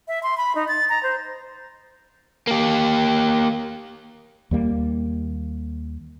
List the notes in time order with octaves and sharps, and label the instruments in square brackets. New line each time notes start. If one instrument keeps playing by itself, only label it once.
[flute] E5
C6
B5
D#4
A6
A#5
C5
[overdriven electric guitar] A#3 G4
[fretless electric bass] D#2 G3 A#3